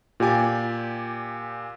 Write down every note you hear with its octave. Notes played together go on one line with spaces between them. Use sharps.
A#2 G4 G5 G#5 D6 A6